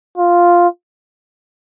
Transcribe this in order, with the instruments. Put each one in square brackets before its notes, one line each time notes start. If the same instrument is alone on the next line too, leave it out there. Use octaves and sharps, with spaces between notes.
[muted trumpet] F4